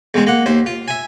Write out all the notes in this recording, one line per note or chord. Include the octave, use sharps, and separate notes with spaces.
E2 G#3 C4
A#3 F#5
D#2 C5
F4
E5 G#5